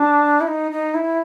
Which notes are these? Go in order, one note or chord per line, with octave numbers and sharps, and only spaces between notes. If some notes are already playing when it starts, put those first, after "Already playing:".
Already playing: D4
E4
D#4
D#4
E4